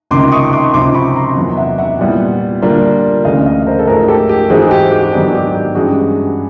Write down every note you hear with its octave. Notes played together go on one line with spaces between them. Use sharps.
C#2 C3 D#3 C6 D6
C#6 D#6
C6 D6
C#2 C3 F3 C6 D6
B5 C#6
A#5 C6
E2 C3 D#3 F#3 B3
E5 F#5
E5 F#5
A#2 G3 B3 E4
D3 G3 A#3 D4 F4
D2 C#3 E3 A3 C#4 D#5 F5
D#5 F5
A#4 C5
A4
G#2 F3 A3 G#4 A#4
G4 A4
G4
G#2 E3 G#3 C4 F#4 G#4
G#4
G4
G4
G#2 D#3 F#3 B3 D4 G4
G4
G4
G2 E3 G#3 C#4 F#4 G#4